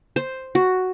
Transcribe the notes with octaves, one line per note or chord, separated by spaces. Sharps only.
C5
F#4